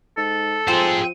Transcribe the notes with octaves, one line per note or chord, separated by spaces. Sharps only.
G#2 A4
F3 C4 G#4 C5